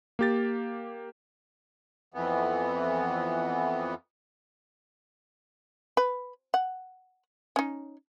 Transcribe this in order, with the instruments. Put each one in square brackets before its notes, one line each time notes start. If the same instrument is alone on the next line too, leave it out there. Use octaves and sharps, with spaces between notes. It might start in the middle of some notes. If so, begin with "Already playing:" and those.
[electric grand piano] A#3 G4 A6
[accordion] F2 E3 B3
[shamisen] B4
F#5
C#4 D#4